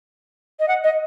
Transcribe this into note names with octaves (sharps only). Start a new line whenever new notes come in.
D#5
F#5
D#5